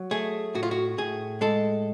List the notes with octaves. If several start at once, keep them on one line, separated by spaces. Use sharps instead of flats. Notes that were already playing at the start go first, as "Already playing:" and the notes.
Already playing: F#3
A3 G#4
A2 F#4
F4
F#4
A2 G#4
G#3 A4